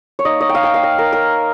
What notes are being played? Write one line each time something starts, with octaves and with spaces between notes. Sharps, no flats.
C#5
A#3 D#4 D#5
D#5
G5
F5
G5
F5
D#5
A#4
A#4